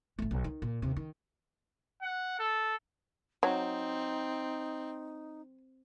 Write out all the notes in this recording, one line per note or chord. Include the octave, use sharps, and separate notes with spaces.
G#1 A3
B1
D#3
A#2
D#2 C3
D#3
F#5
A4
F#3 C4 D#4